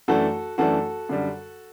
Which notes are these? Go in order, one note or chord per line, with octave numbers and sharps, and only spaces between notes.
F#2 E3 A3 D4 F#4 A4
F#2 E3 A3 D4 F#4 A4
F#2 D3 G3